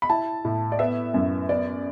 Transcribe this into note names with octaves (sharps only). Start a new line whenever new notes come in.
B5
E4 A5
A2
D5
B3 E5
F#2
B3 D5